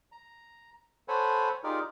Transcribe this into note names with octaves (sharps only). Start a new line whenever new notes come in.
A#5
A4 C5 C#5 F#5 G#5 B5
D#4 F4 G4 G#4 A#4 D5